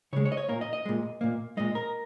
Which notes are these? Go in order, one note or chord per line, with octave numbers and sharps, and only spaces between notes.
C#3 G#3 C#5
C#5
D#5
C#5
A#2 A#3 A#4
D#5
D#5
A#2 G#3
A#2 A#3
A#2 G#3 D#5
A#4